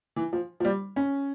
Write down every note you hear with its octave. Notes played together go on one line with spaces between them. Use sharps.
E3
F3
F3
G3
C#4